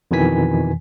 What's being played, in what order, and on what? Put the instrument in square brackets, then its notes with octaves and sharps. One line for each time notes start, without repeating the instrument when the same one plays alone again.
[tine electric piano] F2 B2 D#3 E3 G#5 B6